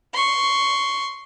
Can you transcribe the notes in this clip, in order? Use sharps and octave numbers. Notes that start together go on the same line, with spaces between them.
C6 C#6